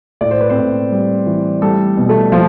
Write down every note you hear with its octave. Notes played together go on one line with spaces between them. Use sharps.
A2 D5
C5
B4
C4 C5
A2
G3
E3
G3 A3 A4
B2
A3 A4
F3 F4